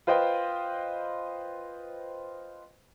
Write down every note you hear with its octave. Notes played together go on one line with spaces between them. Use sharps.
F4 B4 C5 D#5 G5